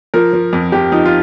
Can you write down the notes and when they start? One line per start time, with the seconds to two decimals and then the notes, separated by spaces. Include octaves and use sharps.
0.14 F3 A#4
0.33 F3
0.53 F2
0.72 F2 G4
0.92 F3 D#4
1.06 F4